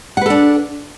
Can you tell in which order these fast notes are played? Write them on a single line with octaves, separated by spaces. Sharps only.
F#5 B4 A4 D4